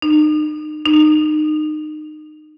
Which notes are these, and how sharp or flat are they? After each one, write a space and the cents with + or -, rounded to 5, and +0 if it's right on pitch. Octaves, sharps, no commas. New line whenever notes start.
D#4 -35
D#4 -25